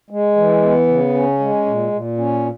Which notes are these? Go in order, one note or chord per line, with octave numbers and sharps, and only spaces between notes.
G#3
E3
B3
C#3
C#4
G#3
A#2
A#2
C#4